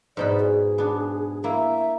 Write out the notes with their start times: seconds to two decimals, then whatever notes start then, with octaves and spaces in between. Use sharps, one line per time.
0.17 G#2 B2 D5 B5
0.40 G#4
0.78 B3 D4
1.44 A#3 E4 E5